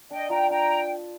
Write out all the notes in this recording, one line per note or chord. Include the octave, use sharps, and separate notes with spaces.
D4 D#5 G5
F4 G5 A#5
D4 G5 A#5